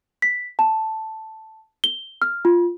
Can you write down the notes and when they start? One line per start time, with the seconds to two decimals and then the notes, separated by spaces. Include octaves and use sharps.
0.22 B6
0.59 A5
1.84 G7
2.22 F6
2.45 F4